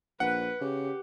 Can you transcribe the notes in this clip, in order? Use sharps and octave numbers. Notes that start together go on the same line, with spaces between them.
A#1 B4 F#5
C#3 G4